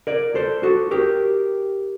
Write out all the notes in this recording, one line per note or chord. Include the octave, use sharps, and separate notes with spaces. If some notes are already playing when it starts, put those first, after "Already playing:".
A#4 D5
A4 C5
F#4 A4
G4 A#4